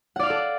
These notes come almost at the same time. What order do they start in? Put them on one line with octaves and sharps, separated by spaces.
F#5 D5 F5 D6 A4